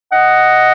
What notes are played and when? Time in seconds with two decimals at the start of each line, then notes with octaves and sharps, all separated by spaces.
0.12 D#5 F#5